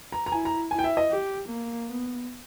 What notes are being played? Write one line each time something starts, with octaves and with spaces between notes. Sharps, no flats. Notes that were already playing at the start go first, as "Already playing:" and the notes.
A#5
A#5
E4 G#5
A#5
E4 G#5
G5
E5
D#5
G4
A#3
B3